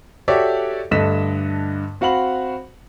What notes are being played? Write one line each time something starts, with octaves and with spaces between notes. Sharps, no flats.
F#4 G4 A4 C#5 D5 E5
G2 D3 A3 D#5 B6 E7
C4 F#4 F5 F#5 B5 F#7